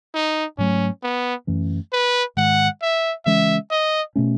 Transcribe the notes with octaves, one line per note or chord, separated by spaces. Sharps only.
D#4
G#2 F#3 A3 C#4
B3
F#2 E3 A3 C#4
B4
G#2 D#3 G#3 F#5
E5
C#3 E3 G#3 C#4 E5
D#5
B2 A3 C#4